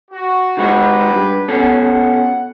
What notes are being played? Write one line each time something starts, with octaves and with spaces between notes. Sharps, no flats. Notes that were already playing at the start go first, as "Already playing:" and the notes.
F#4
D#3 G#3 F#4 G4 B4
G2
B2 C#4 A4 F#5